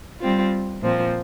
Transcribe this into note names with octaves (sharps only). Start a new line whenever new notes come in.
G3 C4 F4
A#2 F3 C4